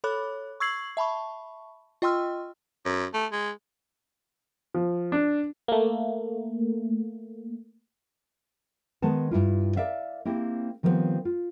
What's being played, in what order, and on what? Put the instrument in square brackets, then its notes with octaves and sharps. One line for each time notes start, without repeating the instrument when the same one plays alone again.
[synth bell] A4 C#5 B5 D6 F#6
C#6 E6 G#6 C7 F#7
E5 A5 B5 C#6
F4 D#5 G5 C6 E6 F6
[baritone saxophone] F#2
A3
G#3
[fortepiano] F3
D4
[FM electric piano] A3 A#3
[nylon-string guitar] D#3 G#3 B3 A5
G2 E4 F4
A#4 D5 E5 F5
A#3 C4 E4 G4
D#3 F3 G3 A3 B3 C4
F4